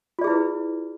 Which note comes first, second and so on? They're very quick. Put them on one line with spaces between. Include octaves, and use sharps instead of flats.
F4 D5 G#4 E4 B4